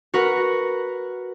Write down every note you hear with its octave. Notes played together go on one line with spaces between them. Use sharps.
F#4 A#4 B4 F#5